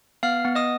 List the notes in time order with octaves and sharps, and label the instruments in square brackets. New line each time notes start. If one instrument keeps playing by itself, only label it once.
[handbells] B3 F5 F6
B3
D#5 D#6